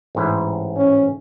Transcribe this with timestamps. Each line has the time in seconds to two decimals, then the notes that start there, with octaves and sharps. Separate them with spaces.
0.15 A1 G#2 E4
0.77 C#4